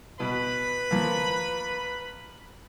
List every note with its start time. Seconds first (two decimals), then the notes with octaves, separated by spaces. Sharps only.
0.20 B2 B4 B5
0.91 F3 A#3